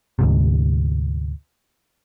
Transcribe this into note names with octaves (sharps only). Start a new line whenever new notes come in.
D2 G#2 C3